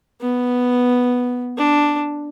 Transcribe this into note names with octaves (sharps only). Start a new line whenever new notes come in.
B3
D4